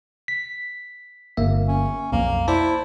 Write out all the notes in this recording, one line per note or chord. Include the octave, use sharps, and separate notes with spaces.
B6
G1 A#3 E5
C#4
B1 F2 A#3
E4 C5 D5 A5